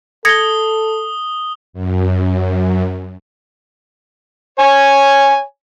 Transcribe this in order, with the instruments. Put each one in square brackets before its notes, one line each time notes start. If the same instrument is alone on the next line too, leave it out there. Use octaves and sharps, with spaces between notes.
[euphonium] A4 [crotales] D#6 G7 [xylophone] G#6 A#6 C#7
[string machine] F#2
[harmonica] C#5 G#5